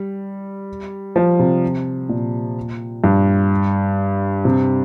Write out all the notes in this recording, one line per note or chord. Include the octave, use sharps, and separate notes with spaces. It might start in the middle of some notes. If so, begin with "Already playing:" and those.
Already playing: G3
F3
C3
A#2
G2
C3